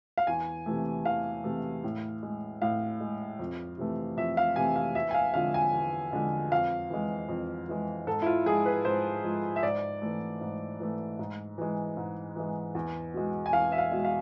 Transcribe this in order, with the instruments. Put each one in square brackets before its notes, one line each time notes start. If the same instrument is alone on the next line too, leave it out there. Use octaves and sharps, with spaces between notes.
[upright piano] F5
E2 G#5
C3 E3 A3
E2 F5
C3 E3 A3
A2
G#3
A2 F5
G#3
F2
C3 E3 A3
F2 E5
F5
C3 E3 A3 G#5
F5
E2 E5
G#5
F5
D3 F3 G#3 F5
G#5
E2
D3 F3 G#3
F2 F5
E3 G#3
F2
E3 G#3
G#2 A4
E4
F4
F3 G#3 G#4
B4
G#2 C5
F3 G#3
E5
G#2 D5
E3 A3
G#2
E3 A3
G#2
E3 G#3
G#2
E3 G#3
E2
B2 G#3
G#5
E2 F5
E5
F5
B2 G#3
F5